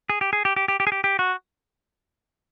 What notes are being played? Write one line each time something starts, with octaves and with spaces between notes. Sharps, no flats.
G#4
G4
G#4
G4
G4
G4
G4
G#4
G4
G4
F#4